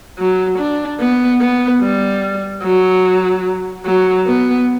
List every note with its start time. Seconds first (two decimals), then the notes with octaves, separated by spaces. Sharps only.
0.19 F#3
0.58 D4
1.00 B3
1.41 B3
1.81 G3
2.63 F#3
3.86 F#3
4.26 B3